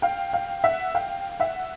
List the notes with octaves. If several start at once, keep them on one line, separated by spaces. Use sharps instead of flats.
F5 G5
F5 G5
E5 F#5
F5 G5
E5 F#5